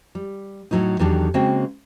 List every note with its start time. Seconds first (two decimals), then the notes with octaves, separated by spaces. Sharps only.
0.15 G3
0.71 A2 F#3 A3 D#4
0.99 E2 D#3 F#3 D4 G4 A4
1.34 C#3 G#3 A#3 C4 F#4 G5